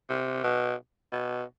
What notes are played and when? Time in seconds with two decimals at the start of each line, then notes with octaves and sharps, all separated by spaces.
0.10 C3
0.43 B2
1.12 B2